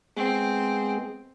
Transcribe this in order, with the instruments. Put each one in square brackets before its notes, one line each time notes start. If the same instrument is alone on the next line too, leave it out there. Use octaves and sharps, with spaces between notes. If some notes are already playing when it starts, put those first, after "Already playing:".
[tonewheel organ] G#3 B3 G#4 [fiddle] C4